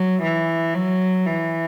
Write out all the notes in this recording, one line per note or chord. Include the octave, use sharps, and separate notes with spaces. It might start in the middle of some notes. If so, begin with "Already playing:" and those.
Already playing: F#3
E3
F#3
E3